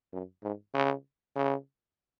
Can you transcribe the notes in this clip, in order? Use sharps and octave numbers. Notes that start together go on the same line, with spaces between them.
F#2
G#2
C#3
C#3